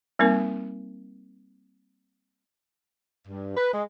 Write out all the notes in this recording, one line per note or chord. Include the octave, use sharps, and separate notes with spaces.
G3 A#3 C4 D#4 A#4
G2
B4
G#3